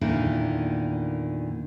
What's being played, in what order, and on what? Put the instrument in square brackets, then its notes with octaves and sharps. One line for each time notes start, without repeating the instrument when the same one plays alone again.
[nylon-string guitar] E2 A#2 D3 D#3